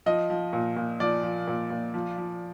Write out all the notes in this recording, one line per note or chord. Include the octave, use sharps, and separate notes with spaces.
F3 D#5
F3
A#2
A#2
F3 D5
F3
A#2
A#2
F3
F3